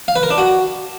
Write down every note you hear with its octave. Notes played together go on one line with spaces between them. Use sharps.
F5
B4
A#4
D4
F#4